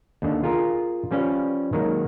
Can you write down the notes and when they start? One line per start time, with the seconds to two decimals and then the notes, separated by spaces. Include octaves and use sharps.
0.22 D#2 D3
0.44 F4 G#4 A#4 A#5
1.11 F3 G3 C#4 B4 F5
1.73 D#3 F#3 G#3 A#3